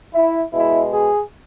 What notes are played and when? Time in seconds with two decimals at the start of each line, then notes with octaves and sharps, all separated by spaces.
0.14 E4
0.54 B2 G#3 E4
0.93 G#4